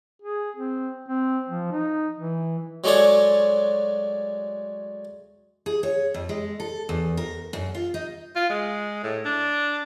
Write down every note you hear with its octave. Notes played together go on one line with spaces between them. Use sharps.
G#4
C4
C4
F3
D#4
E3
F#3 G#3 A3 D4 C#5
G#4
C#5
F2
G#3
A4
E2
A#4
F#2
F4
D#4
F4
G#3
A2
D4